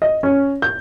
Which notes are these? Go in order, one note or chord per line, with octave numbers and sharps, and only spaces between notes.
D#5
C#4
G6